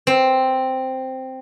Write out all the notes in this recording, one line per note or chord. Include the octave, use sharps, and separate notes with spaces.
C4